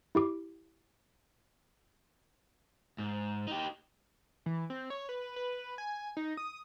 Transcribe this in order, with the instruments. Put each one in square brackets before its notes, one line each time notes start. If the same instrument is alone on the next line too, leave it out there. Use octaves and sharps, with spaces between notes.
[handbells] E4 G4 D6
[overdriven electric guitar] G#2
D#4 G4
[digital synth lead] E3
C4
C#5
B4
B4
G#5
D#4
D#6